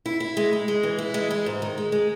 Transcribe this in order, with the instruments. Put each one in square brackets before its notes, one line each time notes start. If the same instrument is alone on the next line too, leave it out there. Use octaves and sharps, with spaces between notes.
[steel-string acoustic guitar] E4
E4
G#3
G#3
G#3
E3
E4
G#3
G#3
G#2
D#3
G#3
G#3